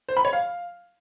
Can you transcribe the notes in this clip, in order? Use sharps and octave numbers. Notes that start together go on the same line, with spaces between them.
C5
B5
C#5
F5